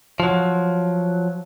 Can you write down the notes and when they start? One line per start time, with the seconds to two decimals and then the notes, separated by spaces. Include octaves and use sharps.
0.20 F3 F#3